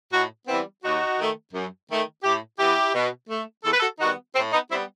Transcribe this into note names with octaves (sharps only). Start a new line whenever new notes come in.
A2 D#4 F#4
E3 G3 B3 C4 E4
D#2 D#4 F#4
D#3 A3
F#2
D#3 A3
A2 E4 G4
E3 B3 E4 G4
B2
A3
E2 A4
B4
F#4 A4
D#3 G3 B3 D#4 F#4
A2 C4
B3 D#4
G3 B3 C4 E4